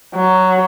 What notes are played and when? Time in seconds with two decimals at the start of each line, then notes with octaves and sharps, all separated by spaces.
0.15 F#3